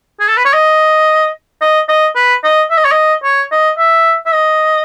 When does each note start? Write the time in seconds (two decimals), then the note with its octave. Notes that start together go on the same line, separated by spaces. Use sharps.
0.20 G#4
0.28 A4
0.37 B4
0.45 C#5
0.54 D#5
1.62 D#5
1.89 D#5
2.16 B4
2.44 D#5
2.70 E5
2.77 D#5
2.85 C#5
2.91 D#5
3.24 C#5
3.52 D#5
3.78 E5
4.26 E5
4.33 D#5